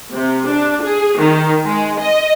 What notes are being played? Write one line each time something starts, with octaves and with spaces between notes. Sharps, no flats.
C3
D4
G#4
D#3
G#3
D#5